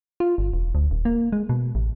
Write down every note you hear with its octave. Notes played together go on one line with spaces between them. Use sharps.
F4
G1
E1
D2
D#1
A#3
G#3
B2
A1